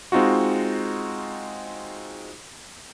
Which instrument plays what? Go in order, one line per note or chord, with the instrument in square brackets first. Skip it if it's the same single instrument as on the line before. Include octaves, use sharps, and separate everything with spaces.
[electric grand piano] G#3 C4 D#4 F4 F#4